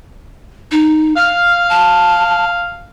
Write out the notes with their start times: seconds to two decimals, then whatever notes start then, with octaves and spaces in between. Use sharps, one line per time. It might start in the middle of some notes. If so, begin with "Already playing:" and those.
0.72 D#4
1.16 F5 F6
1.70 A5